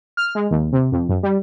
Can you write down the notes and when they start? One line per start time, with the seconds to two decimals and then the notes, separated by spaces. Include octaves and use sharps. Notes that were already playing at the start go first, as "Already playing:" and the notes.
0.17 F6
0.35 G#3
0.51 D#2
0.72 C3
0.92 F2
1.09 F#2
1.23 G3